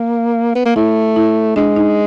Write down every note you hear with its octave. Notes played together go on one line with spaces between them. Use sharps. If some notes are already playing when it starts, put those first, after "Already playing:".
Already playing: A#3
B3
A#3
A3 E4
E4
G#3 D4
D#4